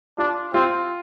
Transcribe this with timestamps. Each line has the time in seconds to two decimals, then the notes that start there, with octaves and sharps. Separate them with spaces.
0.18 D4 F4
0.54 C4 F4